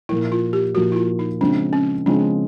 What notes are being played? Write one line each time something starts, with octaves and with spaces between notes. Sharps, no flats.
A#2 F3 A#3 E4
F4
G4
A#2 F3 A#3 F#4
E4
F4
D#4
C#3 F3 G#3 C4 D4
C#4
C#3 F3 G#3 C4 D4